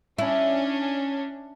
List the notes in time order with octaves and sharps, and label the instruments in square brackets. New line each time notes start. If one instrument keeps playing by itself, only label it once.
[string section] C#4 D4 [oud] E4